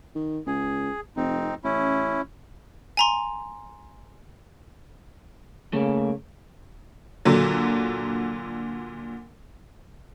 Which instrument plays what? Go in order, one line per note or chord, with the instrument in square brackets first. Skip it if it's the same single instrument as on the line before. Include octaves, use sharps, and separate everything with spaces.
[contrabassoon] D#3
[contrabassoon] C#2 [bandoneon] G#4
[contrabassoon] F1 [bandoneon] C4 D#4
[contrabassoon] A1 [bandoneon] C#4 E4
[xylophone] G#5 A#5 C6
[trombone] C#3 [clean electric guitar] A3 A#3
[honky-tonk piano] A#2 D3 F#3